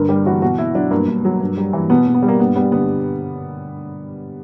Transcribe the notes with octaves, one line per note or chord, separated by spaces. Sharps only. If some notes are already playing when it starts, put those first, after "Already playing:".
Already playing: G2 D3 A#4
G3 G4
E3 F#4
B2 F#4
B2 E4
F#3 D4
G2 A#3
G2
F#3
G2
G3
E3
B2 B3
B2
B3
G3
A#3
G2 B3
G3 B3
D3 B3